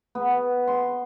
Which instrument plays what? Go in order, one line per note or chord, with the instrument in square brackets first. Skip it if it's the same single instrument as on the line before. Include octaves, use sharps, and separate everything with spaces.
[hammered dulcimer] B3
C6